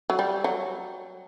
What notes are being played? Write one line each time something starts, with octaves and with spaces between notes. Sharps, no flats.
F#3
G3
F#3